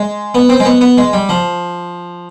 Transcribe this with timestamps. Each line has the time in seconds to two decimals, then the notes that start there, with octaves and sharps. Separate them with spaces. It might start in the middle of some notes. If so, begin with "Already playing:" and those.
Already playing: G#3
0.34 B3
0.49 C4
0.60 G#3
0.65 B3
0.81 B3
0.97 G#3
1.13 G3
1.29 F3